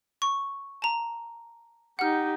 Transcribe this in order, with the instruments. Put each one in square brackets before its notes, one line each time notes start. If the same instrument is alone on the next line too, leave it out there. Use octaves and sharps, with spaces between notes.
[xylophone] C#6
A5 A#5
[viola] D#4 G4 [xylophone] F#5 F6